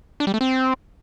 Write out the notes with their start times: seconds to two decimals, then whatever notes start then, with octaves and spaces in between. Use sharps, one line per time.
0.20 D4
0.27 G3
0.34 A3
0.41 C4